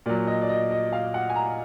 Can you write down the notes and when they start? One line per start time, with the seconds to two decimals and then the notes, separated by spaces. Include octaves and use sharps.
0.06 A#2 D5
0.09 F#3
0.27 D#5
0.42 D5
0.49 D#5
0.71 D#5
0.92 F5
1.14 F#5
1.30 G#5
1.36 A#5